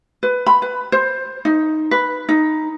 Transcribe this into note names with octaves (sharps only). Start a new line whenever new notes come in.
B4
B5
B4
C5
D#4
B4
D#4